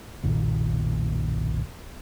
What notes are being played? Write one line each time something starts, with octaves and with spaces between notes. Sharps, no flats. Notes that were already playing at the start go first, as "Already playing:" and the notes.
F#1 B1 A#2 D#3